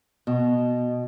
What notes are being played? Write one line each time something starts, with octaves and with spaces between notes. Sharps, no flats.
B2